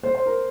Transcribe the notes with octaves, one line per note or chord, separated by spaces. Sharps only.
C5
C5
A#4